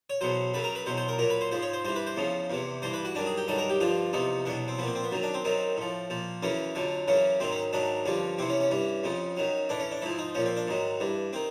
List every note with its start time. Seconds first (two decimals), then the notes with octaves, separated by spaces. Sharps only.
0.10 C#5
0.21 E2 B2 F#3 C5
0.54 F#2 C#3 F#3 B4
0.64 A#4
0.75 B4
0.86 E2 B2 F#3 C5
0.97 C5
1.08 A#4
1.18 A#2 F#3 A#4
1.30 B4
1.41 C5
1.51 G#2 F3 C5
1.62 C#5
1.73 C5
1.85 G2 E3 C5
1.96 B4
2.06 C5
2.16 E2 C#3 F3
2.50 E2 C3 E3
2.82 G2 E3 C5
2.93 B4
3.05 F#4
3.15 G2 D#3 F#3 D4
3.26 G#4
3.37 G4
3.48 G2 D#3 F#3 A4
3.58 A#4
3.70 G4
3.80 G2 D3 F3 F4
4.13 E2 C3 F3 D#4
4.45 E2 B2 F#3 D4
4.68 C4
4.78 F3 B3
4.83 A#2 C4
4.95 C4
5.04 B3
5.11 F#2 D#3 F#3
5.23 D4
5.34 C4
5.44 F#2 D#3 F#3 C4
5.77 A2 F3
6.10 A#2 F3
6.43 F#2 C#3 E3 C#4
6.75 F2 D3 F#3
7.08 F#2 C#3 E3 C#4
7.40 G#2 D#3 F#3 C4
7.52 C#4
7.73 G#2 D#3 F#3 D4
8.05 G2 D3 F3 C#4
8.38 E2 C3 E3 C4
8.50 C#4
8.60 C#4
8.71 G2 E3 C#4
9.03 F2 C#3 F3
9.37 F#2 D#3 F#3
9.69 A2 E3 D4
9.80 C#4
9.92 D4
10.02 G#2 F3 E4
10.18 D#4
10.35 A#2 F3 C#4
10.46 C4
10.57 D4
10.67 G#2 D#3 F#3
11.00 G2 E3
11.33 D#3 C4